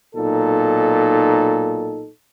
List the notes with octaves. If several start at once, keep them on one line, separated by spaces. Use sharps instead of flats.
B1 A#2 D#4 A4